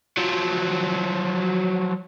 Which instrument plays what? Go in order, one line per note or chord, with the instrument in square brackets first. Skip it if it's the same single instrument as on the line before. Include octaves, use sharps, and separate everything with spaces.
[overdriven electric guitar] F3 F#3